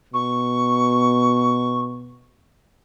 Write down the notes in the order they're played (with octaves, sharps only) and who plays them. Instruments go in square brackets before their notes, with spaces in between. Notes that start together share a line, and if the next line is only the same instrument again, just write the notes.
[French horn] B2 [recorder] C#6